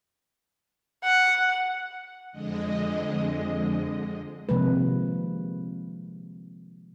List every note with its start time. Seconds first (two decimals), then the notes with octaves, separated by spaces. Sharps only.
1.03 F#5
2.32 F2 D3 G#3 D#5
4.49 C3 D#3 F3 G#3 A#3 B4